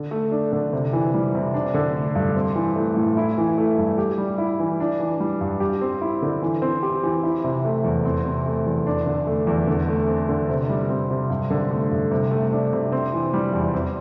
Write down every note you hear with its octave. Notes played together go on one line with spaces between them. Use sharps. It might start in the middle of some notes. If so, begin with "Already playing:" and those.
Already playing: D3
A3
D4
D3
C3
E3
G3
C3
D4
D3
A3
G2
C4
E3
A3
A2
E4
E3
A3
G2
G4
G3
E4
E3
D4
E3
G3
G2
G4
C4
E4
D3
E3
C4
G4
E3
E4
C3
A3
E2
C4
C3
A3
E2
D4
D3
A3
E2
D3
A3
C4
D3
C3
G3
C4
C3
G2
D3
A3
G2
C3
A3
D4
C3
C4
E3
G3
E2
C4